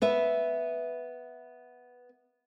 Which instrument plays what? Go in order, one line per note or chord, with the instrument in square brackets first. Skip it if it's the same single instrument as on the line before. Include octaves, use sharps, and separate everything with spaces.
[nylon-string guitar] B3 B4 E5